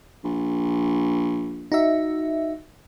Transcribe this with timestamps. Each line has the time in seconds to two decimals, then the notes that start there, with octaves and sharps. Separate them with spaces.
0.24 A#1
1.72 D#4 F#4 E5